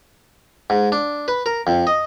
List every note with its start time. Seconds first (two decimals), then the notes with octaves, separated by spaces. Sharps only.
0.70 G#2
0.92 D4
1.28 B4
1.46 A#4
1.67 F2
1.87 D#5